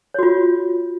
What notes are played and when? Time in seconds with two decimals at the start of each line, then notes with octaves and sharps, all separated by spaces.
0.14 C#5
0.19 F#4
0.23 F4